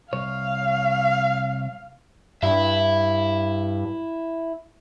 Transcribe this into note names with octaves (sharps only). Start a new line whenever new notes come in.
C2 C#5 F5
G2 E4 E5